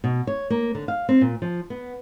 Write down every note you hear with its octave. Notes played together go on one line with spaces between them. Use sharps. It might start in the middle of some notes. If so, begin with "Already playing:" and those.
B2
C#5
A#3
D3
F5
C4
A#2
F3
B3